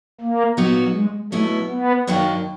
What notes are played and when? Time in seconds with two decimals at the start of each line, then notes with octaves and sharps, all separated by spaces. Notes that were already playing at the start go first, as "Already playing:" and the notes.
0.21 A#3
0.57 A#2 F#3 B3 D#4 F#4
0.94 G#3
1.32 B2 F#3 A3 B3 E4
1.70 B3
2.07 F#2 D#3 F#3 A#3 D4